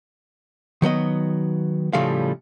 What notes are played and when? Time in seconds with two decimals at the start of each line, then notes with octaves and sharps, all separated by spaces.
0.82 D#3 F#3 B3 D#5
1.93 A2 C#3 F3 G3 A3 F5